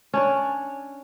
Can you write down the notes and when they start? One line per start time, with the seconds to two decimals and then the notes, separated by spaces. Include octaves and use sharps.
0.14 C#4 D4 C#5